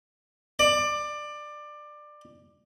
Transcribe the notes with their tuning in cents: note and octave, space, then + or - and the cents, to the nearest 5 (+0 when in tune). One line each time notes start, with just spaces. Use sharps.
D5 +20